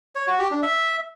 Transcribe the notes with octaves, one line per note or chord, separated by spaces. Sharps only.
C#5
F#4
G4
D4
E5